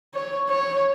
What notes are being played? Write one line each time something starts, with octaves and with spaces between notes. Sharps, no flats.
C#5
C#5